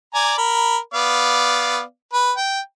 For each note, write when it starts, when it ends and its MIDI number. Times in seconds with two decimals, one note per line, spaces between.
0.14 0.33 74
0.14 0.33 80
0.14 0.33 82
0.38 0.77 70
0.38 0.77 83
0.94 1.81 59
0.94 1.81 74
0.94 1.81 77
2.13 2.32 71
2.38 2.60 79